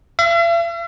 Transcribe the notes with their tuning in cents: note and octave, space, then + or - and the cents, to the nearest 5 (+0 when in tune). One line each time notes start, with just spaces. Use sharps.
E5 +45